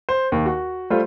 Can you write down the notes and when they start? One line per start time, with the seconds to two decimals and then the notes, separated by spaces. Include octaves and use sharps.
0.09 C5
0.32 D#2
0.46 F#4
0.90 G3 A3 F4 C5